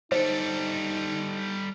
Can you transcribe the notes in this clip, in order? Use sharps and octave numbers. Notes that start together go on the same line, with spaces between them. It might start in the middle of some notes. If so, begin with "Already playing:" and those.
G3 D#4 A4 C5